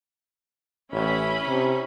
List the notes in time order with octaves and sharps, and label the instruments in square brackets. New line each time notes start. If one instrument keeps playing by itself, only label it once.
[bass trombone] A1 [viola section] C#4 E4 B5
[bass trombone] C3